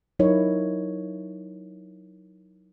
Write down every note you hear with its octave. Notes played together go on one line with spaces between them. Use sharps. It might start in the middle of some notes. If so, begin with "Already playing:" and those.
F#3 D#4 E4 A#4 C#5 D#5